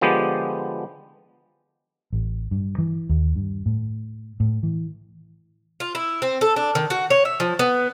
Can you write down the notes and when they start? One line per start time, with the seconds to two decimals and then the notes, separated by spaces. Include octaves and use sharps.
0.01 D3 F3 G#3 B3 G4 D5
2.13 A1
2.51 G2
2.78 E3
3.09 D#2
3.36 G2
3.66 A2
4.40 A2
4.63 E3
5.80 F4
5.95 E4
6.22 C4
6.41 A4
6.56 D4
6.75 D#3
6.90 F#4
7.10 C#5
7.25 E5
7.40 F3
7.59 B3